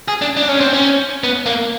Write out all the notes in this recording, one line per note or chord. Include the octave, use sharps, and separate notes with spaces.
G#4
D4
D4
C#4
C4
C#4
B3
A#3